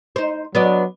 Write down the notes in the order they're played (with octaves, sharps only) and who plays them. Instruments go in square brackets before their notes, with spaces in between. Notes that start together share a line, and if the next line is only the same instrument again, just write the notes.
[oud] D#4 C5
[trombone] F#3 [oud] B3 D4 D#5